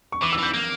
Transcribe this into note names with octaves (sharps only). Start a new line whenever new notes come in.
C#6
E3 D6
E6
E3 G6
A#3